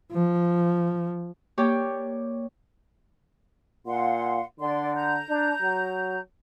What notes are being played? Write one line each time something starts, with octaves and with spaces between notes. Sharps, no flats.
F3
A#3 G4 C#5 D5 G5
A#2 F5 F#5 C6
D3 D5 C6
A#5 G6
D4
F#3